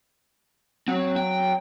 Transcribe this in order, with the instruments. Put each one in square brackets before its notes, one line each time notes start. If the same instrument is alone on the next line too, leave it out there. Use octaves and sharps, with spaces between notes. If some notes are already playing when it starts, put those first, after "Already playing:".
[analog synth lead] F#3 [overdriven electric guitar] C4
[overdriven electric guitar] G5